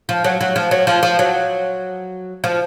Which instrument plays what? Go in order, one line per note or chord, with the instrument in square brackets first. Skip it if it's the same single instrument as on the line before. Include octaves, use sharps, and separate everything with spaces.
[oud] F3
F#3
F#3
F3
F#3
F3
F3
F#3
F3